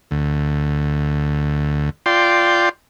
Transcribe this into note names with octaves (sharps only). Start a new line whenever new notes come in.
D2
F4 D5 G5 C6